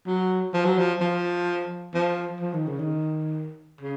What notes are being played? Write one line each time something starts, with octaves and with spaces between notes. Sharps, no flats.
F#3
F3
F#3
F3
F3
F3
F3
D#3
C#3
D#3
C#3